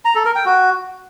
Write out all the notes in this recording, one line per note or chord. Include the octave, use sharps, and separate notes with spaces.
A#5
A4
A#4
G5
F#4